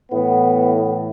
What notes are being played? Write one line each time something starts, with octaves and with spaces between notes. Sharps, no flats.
A2 E3 B3